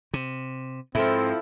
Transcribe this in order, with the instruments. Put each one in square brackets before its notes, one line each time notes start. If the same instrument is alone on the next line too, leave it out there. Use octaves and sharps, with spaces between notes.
[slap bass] C3
[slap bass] G#2 [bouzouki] F3 E4 [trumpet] C4 [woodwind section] A4